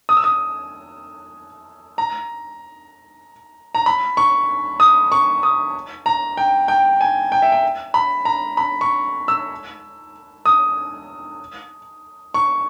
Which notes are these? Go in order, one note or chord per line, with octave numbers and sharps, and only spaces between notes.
D#6
E6
D#6
A#5
A#5
B5
C#6
D#6
C#6
D#6
A#5
G5
G5
G#5
G5
E5
G5
B5
A#5
B5
C#6
E6
D#6
C#6